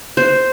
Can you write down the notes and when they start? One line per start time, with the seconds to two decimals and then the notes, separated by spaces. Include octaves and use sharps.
0.17 C5